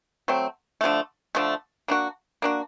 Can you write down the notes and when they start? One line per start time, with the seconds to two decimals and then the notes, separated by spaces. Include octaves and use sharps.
0.28 F#3 A3 C4
0.81 D3 F3 A3
1.35 D3 F3 A3
1.88 A#3 D4 F#4
2.42 A#3 D4 F#4